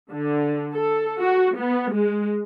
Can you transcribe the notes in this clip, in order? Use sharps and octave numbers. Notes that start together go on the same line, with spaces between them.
D3
A4
F#4
B3
G#3